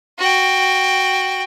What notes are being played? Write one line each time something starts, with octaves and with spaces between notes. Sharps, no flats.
F#4 G5